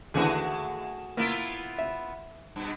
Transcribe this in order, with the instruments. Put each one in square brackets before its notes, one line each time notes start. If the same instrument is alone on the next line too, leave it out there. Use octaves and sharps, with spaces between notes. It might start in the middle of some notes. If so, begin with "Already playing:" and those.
[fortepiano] D#2 D3 E3 [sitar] A3 F#4 G#4
[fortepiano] A#3 [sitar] B3 E4 F4
[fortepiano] E5
[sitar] G2 B2